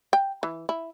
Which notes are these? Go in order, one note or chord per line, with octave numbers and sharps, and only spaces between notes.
G5
E3
E4